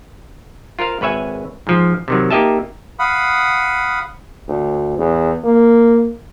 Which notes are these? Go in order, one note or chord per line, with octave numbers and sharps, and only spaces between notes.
F4 A#4 C5 F5
G#1 B4 C#5 E5 G#5
G#2 F3
C3 D#3 F#3
A#3 D#4 G4 D#5 E5 A5
F5 F#5 B5 D#6
D2
E2
A#3